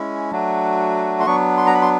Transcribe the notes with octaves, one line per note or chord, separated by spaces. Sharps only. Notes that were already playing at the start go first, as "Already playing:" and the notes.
Already playing: G#3 C#4 E4
F#3 A3 D4 F#4
C6
F#3 B3 D4 C#6
C6
A#5
B5
C6